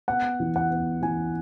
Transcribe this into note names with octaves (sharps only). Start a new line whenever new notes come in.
B3 F#5
E3
F#5
B3
E3 G#5